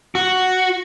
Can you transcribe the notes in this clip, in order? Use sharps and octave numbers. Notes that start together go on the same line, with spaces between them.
F#4